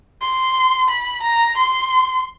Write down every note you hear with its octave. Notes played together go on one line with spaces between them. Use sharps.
C6
B5
A#5
C6